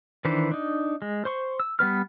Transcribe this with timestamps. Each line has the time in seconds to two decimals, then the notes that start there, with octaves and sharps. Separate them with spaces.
0.25 D#3 E3 D4 B4 C5
0.51 D4 D#4
1.02 G#3
1.25 C5 C6 C#6
1.60 E6
1.79 G3 B3 B4 F6